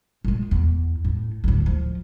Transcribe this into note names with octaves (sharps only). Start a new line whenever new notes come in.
A#2 G#3
E2
A2
D2 A2
F3